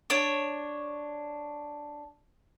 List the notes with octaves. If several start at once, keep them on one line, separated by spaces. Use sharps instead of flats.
D4 C#5